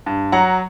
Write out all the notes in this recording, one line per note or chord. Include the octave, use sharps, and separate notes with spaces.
G2
F#3 F#5 A#5